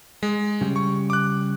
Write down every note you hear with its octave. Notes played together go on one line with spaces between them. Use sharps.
G#3
C#3 G3
C#6
D6 F#6